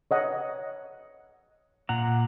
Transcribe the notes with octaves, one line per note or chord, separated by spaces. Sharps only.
C#5 D#5 F#5
A#2 F#5 A#5